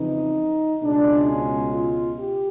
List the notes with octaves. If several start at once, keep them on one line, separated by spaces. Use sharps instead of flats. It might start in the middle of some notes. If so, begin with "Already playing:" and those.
Already playing: F2 C#3 E3 D#4
C#2 B2 G#3 D4
C#4
F4
G4